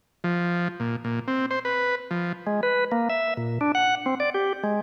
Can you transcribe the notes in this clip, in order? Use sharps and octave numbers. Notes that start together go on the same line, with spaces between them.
F3
A#2
A#2
C4
C5
B4
F3
G#3
B4
A#3
E5
A#2
D4
F#5
C4
D5
G4
G#3